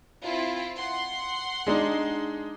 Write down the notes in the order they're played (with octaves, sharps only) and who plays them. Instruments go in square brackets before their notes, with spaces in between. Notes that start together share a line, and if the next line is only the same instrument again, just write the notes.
[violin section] C4 E4 F4
F#5 C6
[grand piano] G#3 D4 D#4